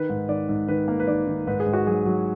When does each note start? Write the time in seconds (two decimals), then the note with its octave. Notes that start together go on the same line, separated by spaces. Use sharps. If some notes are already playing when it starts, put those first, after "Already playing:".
Already playing: D#3 B4
0.10 G#2
0.29 D#3 D5
0.49 G#2
0.68 D#3 B4
0.88 A#3
1.00 B4
1.07 D#3 D5
1.27 D#3
1.47 G#2 B4
1.60 G#4
1.66 G#2
1.73 F#4
1.87 F#3 G#4
2.06 F#3